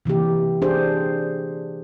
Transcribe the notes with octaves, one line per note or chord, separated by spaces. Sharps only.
C3 E3 A#3 G4
D4 G4 G#4 C5